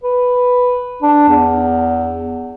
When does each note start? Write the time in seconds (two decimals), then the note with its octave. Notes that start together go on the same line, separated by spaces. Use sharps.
0.03 B4
1.02 D4
1.28 E2